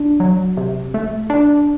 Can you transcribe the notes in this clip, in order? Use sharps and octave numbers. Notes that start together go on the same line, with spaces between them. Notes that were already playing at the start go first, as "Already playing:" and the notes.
Already playing: D4
F#3
C3
A3
D4